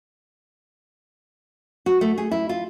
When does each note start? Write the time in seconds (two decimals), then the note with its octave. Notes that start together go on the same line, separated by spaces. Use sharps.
1.86 F#4
2.01 A3
2.18 G#4
2.31 E4
2.49 F4